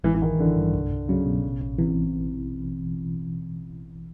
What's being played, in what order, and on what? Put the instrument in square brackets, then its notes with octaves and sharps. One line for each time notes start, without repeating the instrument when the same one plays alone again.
[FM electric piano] A1 [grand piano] E3
[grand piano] E3
[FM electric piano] A1 [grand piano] D#3
[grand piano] D3 [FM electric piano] E3
[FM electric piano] G2
C2
C2
[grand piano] C#3 [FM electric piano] F#3
[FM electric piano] B2
A1
A1
[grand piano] C3 [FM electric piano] E3
[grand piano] C3